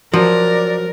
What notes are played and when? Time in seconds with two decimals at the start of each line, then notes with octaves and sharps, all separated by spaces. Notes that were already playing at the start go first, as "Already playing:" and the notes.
0.13 F3 F#3 A#4 D5